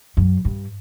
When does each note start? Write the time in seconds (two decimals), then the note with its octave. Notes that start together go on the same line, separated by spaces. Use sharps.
0.17 F#2
0.45 G2